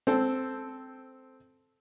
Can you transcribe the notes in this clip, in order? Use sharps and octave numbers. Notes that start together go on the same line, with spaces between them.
C4 A4